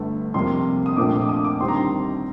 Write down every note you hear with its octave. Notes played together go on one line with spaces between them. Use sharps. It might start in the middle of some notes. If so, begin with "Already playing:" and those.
Already playing: G1 G2 D3 A3
F2 C3 G3 A#3 C6
D#6
A#1 A#2 F3 A3 C4 D6
D6
D#6
D6
D#2 D3 G3 C4 C6
A#5
C6